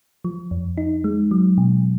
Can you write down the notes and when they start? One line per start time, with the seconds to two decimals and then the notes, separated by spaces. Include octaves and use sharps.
0.24 F3
0.51 F2
0.78 D#4
1.04 G#3
1.31 F#3
1.58 B2